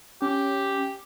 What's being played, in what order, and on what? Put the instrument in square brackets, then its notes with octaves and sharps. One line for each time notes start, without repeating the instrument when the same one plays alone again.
[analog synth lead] C#4 [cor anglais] G4